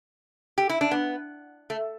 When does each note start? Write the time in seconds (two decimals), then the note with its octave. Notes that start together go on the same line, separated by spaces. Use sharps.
0.58 G4
0.69 E4
0.81 D4
0.91 B3
1.70 A3